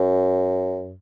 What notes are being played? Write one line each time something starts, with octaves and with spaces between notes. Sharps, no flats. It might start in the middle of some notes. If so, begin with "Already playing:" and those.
Already playing: F#2